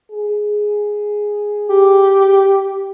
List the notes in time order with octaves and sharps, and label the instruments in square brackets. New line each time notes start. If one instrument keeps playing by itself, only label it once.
[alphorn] G#4
[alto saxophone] G4